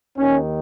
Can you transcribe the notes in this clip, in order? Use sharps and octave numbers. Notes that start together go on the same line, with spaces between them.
D#2 D#3 C#4